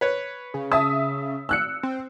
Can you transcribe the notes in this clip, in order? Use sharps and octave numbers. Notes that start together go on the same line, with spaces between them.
B4 C#5
C#3
E5 A5 D#6
E6 F#6 C#7
C4